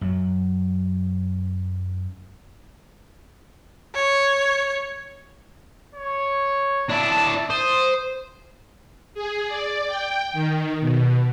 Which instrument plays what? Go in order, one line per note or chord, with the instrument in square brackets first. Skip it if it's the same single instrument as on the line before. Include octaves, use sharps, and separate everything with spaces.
[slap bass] F#2 F#3
[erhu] C#5
[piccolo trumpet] C#5
[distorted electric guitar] D4 E4 [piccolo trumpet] A5
[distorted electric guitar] C5 [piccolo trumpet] D#6
[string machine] G#4
D5
G5
D#3
B2